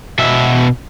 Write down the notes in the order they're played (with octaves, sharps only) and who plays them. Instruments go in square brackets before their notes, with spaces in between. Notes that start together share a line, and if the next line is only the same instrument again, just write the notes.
[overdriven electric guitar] B2 E5